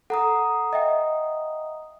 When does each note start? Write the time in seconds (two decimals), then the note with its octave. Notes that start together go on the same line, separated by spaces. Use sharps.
0.10 A4 F#5 A#5 D#6
0.73 D#5 E5 G5